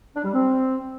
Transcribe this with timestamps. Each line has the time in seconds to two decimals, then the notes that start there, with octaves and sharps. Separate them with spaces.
0.16 D4
0.25 G3
0.34 C4